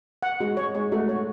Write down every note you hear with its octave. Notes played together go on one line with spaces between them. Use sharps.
F#5
G#3 F#4
G#3 C#5
G#3 C#5
A3 F#4
C#5